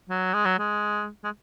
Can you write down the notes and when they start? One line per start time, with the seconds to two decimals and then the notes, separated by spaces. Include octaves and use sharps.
0.09 F#3
0.34 G#3
0.45 F#3
0.59 G#3
1.24 G#3